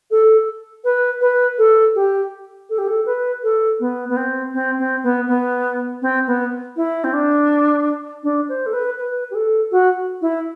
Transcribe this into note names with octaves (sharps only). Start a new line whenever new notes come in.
A4
B4
B4
A4
G4
A4
G4
A4
B4
A4
B3
B3
C4
C4
C4
B3
B3
C4
B3
E4
C4
D4
D4
C5
A4
B4
B4
G4
A4
F#4
E4